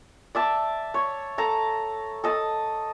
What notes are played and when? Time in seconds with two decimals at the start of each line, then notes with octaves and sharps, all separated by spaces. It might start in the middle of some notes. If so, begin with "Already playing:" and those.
0.35 D5 E5 A5
0.94 C#5
1.38 A4 A5 A#5
2.24 A4 D#5 A5